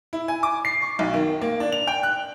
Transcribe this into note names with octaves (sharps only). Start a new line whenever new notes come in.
E4
G#5
D6
C7
C#6
B1
D#3
A#3
D4
F7
G5
F#6